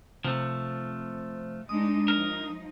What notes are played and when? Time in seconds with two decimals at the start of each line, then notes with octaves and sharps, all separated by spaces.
0.24 C3 F3 A3
1.69 G#3 D4 D#4 D#6
2.08 F3 D#4 A#4